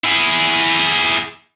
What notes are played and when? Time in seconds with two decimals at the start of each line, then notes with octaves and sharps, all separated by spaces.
0.04 E4 G#4